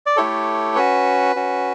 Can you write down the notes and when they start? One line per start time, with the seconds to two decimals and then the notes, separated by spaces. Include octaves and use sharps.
0.06 D5
0.17 A3 E4 G4 A4 C#5
0.76 C#4 F#4 B4
1.36 C#4 F#4